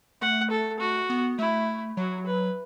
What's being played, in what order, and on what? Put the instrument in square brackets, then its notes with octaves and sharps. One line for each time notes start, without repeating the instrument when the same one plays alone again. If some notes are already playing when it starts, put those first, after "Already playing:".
[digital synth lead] A3 [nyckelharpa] F#5
[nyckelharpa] A4
F#4
[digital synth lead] B3
[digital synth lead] A3 [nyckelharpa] E4
[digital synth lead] F#3 [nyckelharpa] F#4
[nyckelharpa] B4